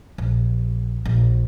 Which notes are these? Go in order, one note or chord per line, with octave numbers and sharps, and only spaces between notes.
A#1
A#1